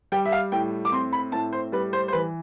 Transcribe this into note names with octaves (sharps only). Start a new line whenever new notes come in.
G3 G5
E5
F5
A2 G5
D6
C4 C6
B5
A2 A5
C5
G3 B4
C5
C5
E3 B4